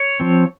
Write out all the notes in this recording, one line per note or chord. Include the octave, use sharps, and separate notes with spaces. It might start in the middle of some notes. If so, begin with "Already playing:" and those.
Already playing: C#5
F3 C4